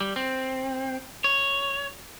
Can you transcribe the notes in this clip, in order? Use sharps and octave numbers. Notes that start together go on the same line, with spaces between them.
G3
C4
C#5